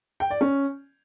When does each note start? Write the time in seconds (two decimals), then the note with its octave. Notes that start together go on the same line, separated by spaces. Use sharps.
0.20 G5
0.30 D5
0.41 C#4